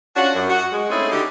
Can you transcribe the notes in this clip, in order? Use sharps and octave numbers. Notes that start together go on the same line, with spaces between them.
C#4 D4 F4 F#4
F#2
F#4
G#3
A3 C4 C#4 D#4 E4 G#4
D3 D#4 F#4 G4